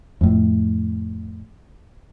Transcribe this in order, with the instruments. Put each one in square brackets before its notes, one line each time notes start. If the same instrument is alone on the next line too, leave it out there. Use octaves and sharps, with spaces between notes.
[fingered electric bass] F2 A2